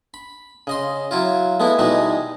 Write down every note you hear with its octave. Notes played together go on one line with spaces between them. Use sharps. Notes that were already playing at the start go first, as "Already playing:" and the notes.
B5
C#3 D#5 C6
F#3 E4 F4
G#3 A3 B3 E4
B2 E3 G3 G#3 D#4